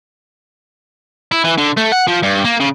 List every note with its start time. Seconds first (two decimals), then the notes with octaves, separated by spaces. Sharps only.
1.32 E4
1.44 E3
1.58 D3
1.77 A3
1.92 F#5
2.07 F3
2.23 G2
2.45 A#3
2.60 C#3